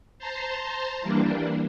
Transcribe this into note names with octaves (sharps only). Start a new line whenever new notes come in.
C5 A5 A#5 C6
E3 G3 A#3 D4